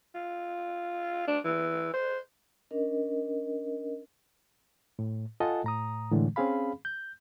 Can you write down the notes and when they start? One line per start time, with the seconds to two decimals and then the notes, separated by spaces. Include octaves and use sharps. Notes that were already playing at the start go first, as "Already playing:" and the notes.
0.15 F4
1.27 D4
1.45 E3
1.94 C5
2.71 C#4 D4 A#4 D#5
4.99 A2
5.40 F4 A4 D#5 F#5 G#5 A5
5.64 A2 A#5 D#6
6.12 A2 D3 E3 G#3 A3
6.36 C4 C#4 G#4 F5 B5
6.85 G6